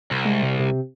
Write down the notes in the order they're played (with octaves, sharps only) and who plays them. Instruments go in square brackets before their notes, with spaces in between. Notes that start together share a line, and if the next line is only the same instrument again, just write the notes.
[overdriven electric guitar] C2
[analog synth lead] G#3
C3
C3